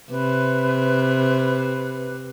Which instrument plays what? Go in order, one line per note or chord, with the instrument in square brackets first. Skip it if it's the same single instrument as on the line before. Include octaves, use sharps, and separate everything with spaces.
[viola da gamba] C3 [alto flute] B4